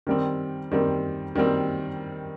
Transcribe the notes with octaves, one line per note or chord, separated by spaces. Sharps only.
D#3 G3 C4
D#3 G3 C4
D#3 G3 C4